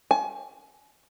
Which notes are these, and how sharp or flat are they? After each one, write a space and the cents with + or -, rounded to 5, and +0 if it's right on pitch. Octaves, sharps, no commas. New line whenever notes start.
G#5 +35